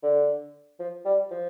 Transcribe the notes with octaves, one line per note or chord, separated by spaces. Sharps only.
D3
F3
G3
F3